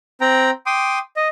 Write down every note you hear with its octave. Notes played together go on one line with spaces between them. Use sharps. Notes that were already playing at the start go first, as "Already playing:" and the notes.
C4 G5 A#5
G5 C6 D6 D#6
D#5